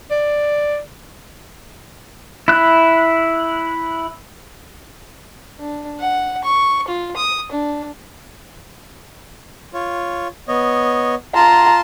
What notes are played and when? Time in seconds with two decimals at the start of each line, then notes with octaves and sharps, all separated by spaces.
0.11 D5
2.48 E4 F#6
5.60 D4
5.99 F#5
6.44 C#6
6.88 F4
7.16 D#6
7.51 D4
9.74 F4 C#5
10.48 B3 C#5 D#5
11.35 F4 A5 A#5 C6